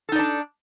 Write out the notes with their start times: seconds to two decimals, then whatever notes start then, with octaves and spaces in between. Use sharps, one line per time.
0.09 A4
0.12 D#4
0.16 D5
0.19 D4